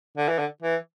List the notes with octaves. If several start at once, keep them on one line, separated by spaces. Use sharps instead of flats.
D3
E3
D3
E3